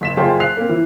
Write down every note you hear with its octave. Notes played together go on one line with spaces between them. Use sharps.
F#1 B6 E7
F#1 F4 G#4 C5 G5 A5
F#6 C7 F7
A#3 C4
E3